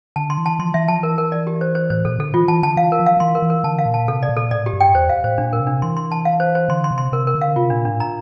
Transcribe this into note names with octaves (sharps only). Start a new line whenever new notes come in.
D3 A5
C6
E3
A5
F3 C6
E3 E5
F3 A5
E3 A#4
A#4
D5
G4
C5
C5
A2 C5
A#2 A4
D3 A4
E3 F4
E3 A5
D3 A5
E3 F5
A#4
F3
F5
F3
E3 C6
A#4
E3
A#4
D3 A5
F5
A#2
A5
C3 A4
D5
A#2
A4
A2 D5
G4
G2
G5
E2 C5
F5
A2 C5
A#2 D4
A#4
C3
D4
E3 C6
C6
A5
F5
C5
C5
D3 C6
C6
C3
C6
C3 A#4
A#4
D3
F5
C3 F4
A#2 D4
A2 D4
A#5